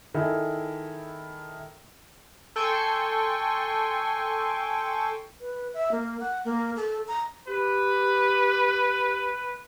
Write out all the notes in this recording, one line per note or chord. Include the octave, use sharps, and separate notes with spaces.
D#3 E4 G#4 A4
A4 G5 G#5 C6 C#6
B4
E5
A#3
F#5
A#3
A4
A#5
G4 B4